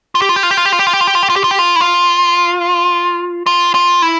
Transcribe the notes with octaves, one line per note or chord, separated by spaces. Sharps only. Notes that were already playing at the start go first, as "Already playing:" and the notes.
F4
G4
F4
G4
F4
G4
F4
G4
F4
G4
F4
G4
F4
G4
F4
G4
F4
G4
F4
G4
F4
E4
F4
F4
F4
E4